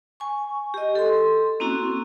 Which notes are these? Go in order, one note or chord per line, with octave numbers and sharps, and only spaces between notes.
G#5 C#6
G4 D#5
A4 C6
A#3 C4 C#4 E4 F#4